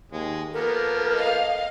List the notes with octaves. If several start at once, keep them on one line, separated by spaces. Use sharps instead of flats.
D#2 G#3
F3 A#3 B3 A4 A#4
D#5 F5